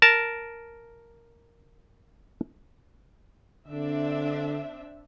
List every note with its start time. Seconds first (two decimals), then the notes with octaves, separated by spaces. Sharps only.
0.02 A#4 A5
3.68 D3 C4 D4 E5